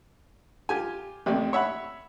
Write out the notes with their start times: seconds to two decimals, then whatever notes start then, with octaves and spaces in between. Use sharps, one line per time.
0.69 F4 G4 G#5
1.26 A1 D#2 C3 D5
1.53 C#5 E5 F#5 B5